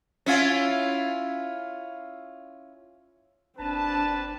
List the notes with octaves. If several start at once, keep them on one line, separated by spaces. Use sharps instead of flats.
C#4 E4 F4
G1 C4 D4 B4 A5